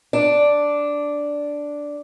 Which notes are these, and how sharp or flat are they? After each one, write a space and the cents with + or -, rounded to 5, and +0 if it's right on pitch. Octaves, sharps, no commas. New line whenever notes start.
D4 -5